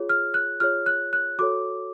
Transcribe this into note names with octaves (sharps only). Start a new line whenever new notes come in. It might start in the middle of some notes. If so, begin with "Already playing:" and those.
Already playing: F4 G#4 C#5
F6
F#6
F4 G#4 C#5 F6
F#6
F#6
F#4 A4 C#5 D6